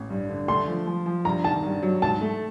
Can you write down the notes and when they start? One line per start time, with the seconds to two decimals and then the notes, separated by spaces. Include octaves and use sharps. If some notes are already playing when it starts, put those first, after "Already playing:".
Already playing: A1
0.10 G2
0.29 D3
0.48 A3 C6
0.67 F3
0.87 F3
1.06 F3
1.25 G2 A#5
1.44 D#3 A5
1.63 G2
1.82 F#3
2.02 G#2 A5
2.21 A3